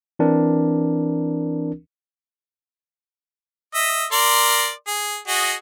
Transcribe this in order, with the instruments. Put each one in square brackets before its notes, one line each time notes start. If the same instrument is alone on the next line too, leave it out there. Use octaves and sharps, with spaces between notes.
[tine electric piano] E3 C4 D4 A#4
[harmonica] D#5 E5
A#4 D5 C6
G#4
F#4 G#4 D#5